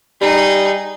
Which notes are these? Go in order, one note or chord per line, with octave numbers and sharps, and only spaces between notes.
G3 D#4 G#4